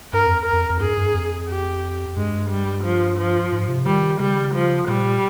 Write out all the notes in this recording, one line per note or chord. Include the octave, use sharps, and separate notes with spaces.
G2 A#4
F2
A#4
F2
F2
G2 G#4
G2
F2
G4
G2 G#3
G3
F3
F3
G#2
C3
D#3 G3
C#3 G3
F3
A#2 G3